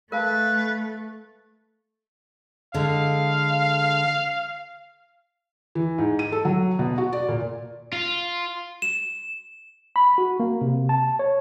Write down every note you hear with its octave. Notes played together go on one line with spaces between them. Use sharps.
A3 A#4 B4 F5 A5
D3 G#3 F5
E3
G#2
D#7
A4
F#3
B2
F#4
D5
A#2
F4
E7
B5
F#4
A#3
C3
A5
C#5